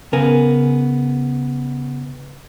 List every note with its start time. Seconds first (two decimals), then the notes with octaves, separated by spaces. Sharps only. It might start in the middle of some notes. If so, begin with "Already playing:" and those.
0.13 C#3 B3 A#4 G#5